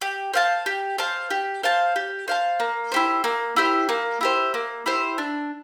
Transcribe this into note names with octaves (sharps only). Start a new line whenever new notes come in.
G4
C5 F5 A5
G4
C5 F5 A5
G4
C5 F5 A5
G4
C5 F5 A5
A#3
E4 G4 C5
A#3
E4 G4 C5
A#3
E4 G4 C5
A#3
E4 G4 C5
D4